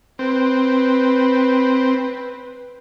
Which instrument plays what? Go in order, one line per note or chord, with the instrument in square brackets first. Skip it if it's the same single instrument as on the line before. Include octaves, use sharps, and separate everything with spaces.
[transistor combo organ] C4 [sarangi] B4